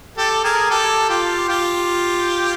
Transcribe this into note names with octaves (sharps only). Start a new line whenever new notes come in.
G4 A4
G#4 A#4
G4 A4
F4 G4
F4 G4